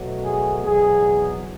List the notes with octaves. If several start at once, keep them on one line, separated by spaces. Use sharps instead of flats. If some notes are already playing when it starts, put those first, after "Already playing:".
Already playing: B2 F#3 A3
G#4
E2 B2 F#3 G#4